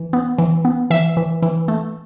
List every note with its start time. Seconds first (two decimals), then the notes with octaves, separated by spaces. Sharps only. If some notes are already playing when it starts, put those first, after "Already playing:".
Already playing: E3
0.13 B3
0.38 E3
0.65 B3
0.90 E3 E5
1.17 E3
1.42 E3
1.68 A3